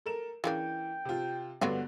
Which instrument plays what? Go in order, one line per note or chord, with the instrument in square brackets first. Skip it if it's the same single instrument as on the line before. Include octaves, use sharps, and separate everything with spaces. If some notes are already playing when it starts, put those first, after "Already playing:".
[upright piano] A4 A#4 E7
[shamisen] C#3 A#3 D4 [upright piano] E3 [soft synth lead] G5
[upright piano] C3 F4
[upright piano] G2 D3 [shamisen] F#3 F4 F#4 [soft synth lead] B3